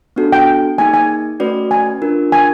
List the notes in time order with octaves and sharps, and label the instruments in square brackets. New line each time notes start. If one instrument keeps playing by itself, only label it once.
[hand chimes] B3 D4 F#4 A4
[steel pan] G5
[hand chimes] A#3 D#4 G#4 [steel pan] G#5
[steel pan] G#5
[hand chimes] A3 C#4 F#4 B4 D5
[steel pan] G#5
[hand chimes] D4 F4 A#4
[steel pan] G#5